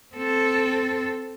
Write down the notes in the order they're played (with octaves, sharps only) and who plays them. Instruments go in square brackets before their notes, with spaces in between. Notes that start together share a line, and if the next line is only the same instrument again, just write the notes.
[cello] C4 A4